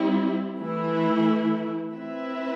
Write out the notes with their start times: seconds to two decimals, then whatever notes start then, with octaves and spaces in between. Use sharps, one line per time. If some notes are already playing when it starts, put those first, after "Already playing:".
Already playing: G3 C4 E4
0.59 E3 A3 E4
1.94 C4 E4 B4 E5